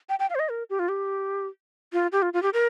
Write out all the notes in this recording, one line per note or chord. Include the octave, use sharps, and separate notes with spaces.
G5
G5
F5
C5
D#5
A#4
G4
F4
G4
F4
G4
F4
F4
G4
A#4